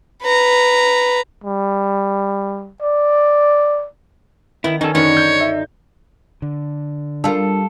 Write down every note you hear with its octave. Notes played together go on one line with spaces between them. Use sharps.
B4 A#5
G3
D5
D#3 B3 E4
D#3 C#4 D#4 A4
F#2 D3 D#3 D#4 B4 C#5
G6
E5
D3
G3 D4 F4 A4 A#4